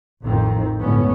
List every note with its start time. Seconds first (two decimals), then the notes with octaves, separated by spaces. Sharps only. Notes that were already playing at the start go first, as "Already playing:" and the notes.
0.22 A1 F2 D#3 C4
0.81 G1 C#2 A2 D3 B3 C#4